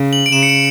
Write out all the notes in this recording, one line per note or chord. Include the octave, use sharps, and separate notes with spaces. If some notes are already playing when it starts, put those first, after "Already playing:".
Already playing: C#3
F#7
D7
C#3 E7
C#7
D7